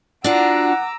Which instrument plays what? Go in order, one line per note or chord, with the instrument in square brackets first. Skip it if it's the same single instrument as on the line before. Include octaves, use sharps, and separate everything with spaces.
[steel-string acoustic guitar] D4 F4 F#4 [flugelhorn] F#5 [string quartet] A#5 D6 E6